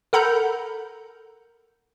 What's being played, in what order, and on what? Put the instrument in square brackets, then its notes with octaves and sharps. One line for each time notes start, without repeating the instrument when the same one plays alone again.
[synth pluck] A4 A#4 F#5 A#5 B5 G6